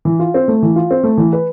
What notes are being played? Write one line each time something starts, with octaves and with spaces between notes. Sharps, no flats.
E3
F4
C4
A3
E3
F4
C4
A3
E3
B4